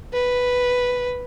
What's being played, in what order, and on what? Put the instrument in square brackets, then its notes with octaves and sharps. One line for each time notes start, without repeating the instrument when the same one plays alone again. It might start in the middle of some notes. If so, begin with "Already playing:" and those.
[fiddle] B4